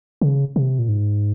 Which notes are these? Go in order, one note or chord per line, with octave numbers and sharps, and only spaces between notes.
C#3
C3
A#2
G#2